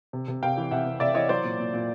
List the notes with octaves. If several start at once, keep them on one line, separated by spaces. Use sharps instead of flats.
C3
C3
C3 F5 G5
E3
C3 E5 F#5
C3
C3 D5 E5
E3 C#5 D#5
F#3 C5 D5
A#2
A#2
A#2